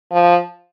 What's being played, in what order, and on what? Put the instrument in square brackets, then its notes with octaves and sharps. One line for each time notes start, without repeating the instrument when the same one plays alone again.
[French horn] F3